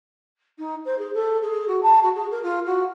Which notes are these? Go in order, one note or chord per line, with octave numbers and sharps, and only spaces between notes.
D#4
C5
G#4
A4
G#4
F#4
A5
F#4
G#4
A#4
F4
F#4